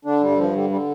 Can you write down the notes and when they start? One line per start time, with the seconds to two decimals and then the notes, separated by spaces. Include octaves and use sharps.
0.05 D3 D4
0.21 G2 G3
0.37 G2 F3
0.53 D3 G3
0.70 D3 G3